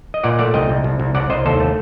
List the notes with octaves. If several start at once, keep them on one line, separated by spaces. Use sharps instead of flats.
D#5
A#2 D5 F#5
A3 D5 F#5
C2 D#5 G5
C2
C2
C2
C2 D5 F#5
C2 C5 D#5
D#2 A4 C5
A3